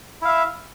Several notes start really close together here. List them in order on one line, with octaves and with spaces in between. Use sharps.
E4 F5 E5